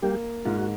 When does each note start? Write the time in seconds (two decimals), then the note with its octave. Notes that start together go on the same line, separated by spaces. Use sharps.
0.02 G3 A#3 G4
0.45 G#2 F4
0.56 F#4